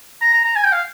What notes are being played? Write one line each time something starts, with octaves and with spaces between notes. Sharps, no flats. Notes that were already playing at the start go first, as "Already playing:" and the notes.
A#5
A#5
A#5
G#5
G5
F5